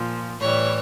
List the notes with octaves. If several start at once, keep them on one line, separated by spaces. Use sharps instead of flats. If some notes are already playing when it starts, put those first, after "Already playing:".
Already playing: A#2 F3
A2 E3 G3 C#5